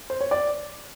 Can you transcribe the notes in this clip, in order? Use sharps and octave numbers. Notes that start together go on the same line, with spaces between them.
C5
C#5
D5